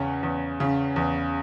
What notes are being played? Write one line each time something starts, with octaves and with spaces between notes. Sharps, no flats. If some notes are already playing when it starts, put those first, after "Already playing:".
Already playing: E2 C#3 C#4
E2
C#3
E2